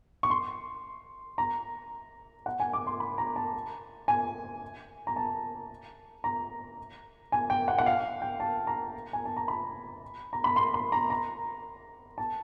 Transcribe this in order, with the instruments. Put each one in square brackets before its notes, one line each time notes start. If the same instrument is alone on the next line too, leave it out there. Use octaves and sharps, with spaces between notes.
[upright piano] C#6
C6
A#5
F#5
G#5
D6
C6
B5
A#5
A5
G#5
A#5
A5
A#5
G#5
G5
F#5
F#5
F5
G5
A5
A#5
G#5
A5
A#5
B5
A#5
B5
C6
B5
A#5
A#5
A5